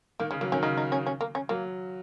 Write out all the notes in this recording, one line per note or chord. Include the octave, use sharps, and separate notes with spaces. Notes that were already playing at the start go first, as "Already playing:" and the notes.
D#3 A#3
C#3 G#3
F#3 A#3
D#3 C#4
C#3 D#4
D#4
C#4
C#4
A#3
C#4
F#3 A#3